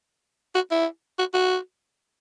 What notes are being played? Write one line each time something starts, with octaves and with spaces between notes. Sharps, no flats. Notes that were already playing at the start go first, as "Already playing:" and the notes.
F#4
E4
F#4
F#4